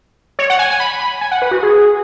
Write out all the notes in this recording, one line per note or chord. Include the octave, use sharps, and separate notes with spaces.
C#5
F#5
G#5
G#5
B5
B5
G#5
F#5
B4
F#4
G#4